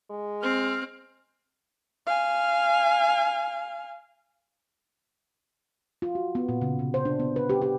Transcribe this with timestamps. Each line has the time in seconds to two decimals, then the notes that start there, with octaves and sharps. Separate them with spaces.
0.10 G#3
0.43 C4 F6
2.07 F5 G#5
6.02 F4
6.15 F#4
6.35 B3
6.49 A#2
6.62 C#3
6.79 C3
6.94 C5
7.05 D4
7.20 B3
7.36 B4
7.50 G4
7.62 G4